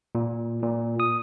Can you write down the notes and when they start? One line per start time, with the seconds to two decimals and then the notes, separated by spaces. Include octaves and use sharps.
0.15 A#2
0.62 A#2
1.00 D#6